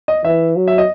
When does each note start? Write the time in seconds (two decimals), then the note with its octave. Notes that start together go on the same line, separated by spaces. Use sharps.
0.08 D#5
0.25 E3 E5
0.56 F#3
0.68 E5
0.78 D#5